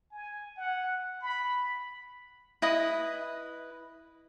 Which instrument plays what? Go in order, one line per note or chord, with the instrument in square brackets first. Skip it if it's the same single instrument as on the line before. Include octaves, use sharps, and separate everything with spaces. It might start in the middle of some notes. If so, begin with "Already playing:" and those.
[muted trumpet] G#5
F#5
B5
[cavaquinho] E4 B4 D#5 D#6